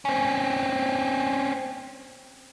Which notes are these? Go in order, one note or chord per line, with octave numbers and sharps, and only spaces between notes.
C4 C#4